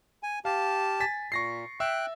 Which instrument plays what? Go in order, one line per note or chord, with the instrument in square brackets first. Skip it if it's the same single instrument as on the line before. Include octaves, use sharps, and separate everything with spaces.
[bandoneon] G#5
[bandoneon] G4 A5 [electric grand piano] F5
[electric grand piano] G#5 A6 B6
[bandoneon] A#2 [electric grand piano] C#6 A#6 C7
[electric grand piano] E5 E6 [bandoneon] G5 F#6